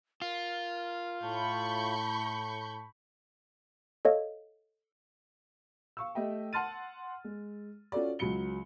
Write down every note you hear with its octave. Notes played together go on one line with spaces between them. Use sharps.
F4 A#4
A2 A5 B5 C#6 G6
A4 C#5 D#5 F5
F5 C#6 E6
A3 G4 D#5 E5 G5
F#5 A5 C6 F6 A6 D#7
G#3
C#4 F4 F#4 A4 D5
C#2 F#3 B5 C#7 G7